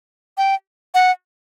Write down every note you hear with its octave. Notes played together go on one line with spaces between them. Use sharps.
G5
F#5